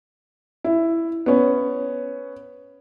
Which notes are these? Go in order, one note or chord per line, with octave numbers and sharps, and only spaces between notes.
E4
B3 C#4